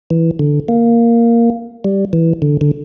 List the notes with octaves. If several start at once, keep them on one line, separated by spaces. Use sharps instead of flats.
E3
D3
A#3
G3
E3
D3
D3